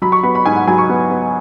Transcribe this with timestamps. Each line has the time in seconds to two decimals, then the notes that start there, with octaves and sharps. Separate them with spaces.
0.02 F#3 B5
0.12 C#6
0.23 B3 B5
0.35 B5
0.45 G#2 G#5
0.56 F#5
0.67 F#3 G#5
0.78 C#6
0.89 B3
1.11 B3